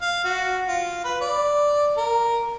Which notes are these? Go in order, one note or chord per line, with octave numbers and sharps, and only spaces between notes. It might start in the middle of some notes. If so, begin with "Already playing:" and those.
F5
F#4
F4
B4
D5
A#4